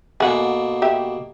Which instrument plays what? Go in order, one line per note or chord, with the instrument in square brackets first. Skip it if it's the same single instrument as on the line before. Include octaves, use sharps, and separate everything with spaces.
[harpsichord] B2 D3 A#3 [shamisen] G#4 F#5
[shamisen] G4 E5